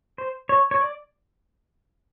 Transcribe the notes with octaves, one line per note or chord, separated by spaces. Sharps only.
C5
C#5
C#5
D5